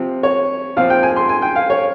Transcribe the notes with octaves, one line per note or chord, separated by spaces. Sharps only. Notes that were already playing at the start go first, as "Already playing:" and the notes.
Already playing: C3 F3 C4
C#5
A#2 F3 C4 F5
G5
G#5
C6
G#5
G5
F5
C#5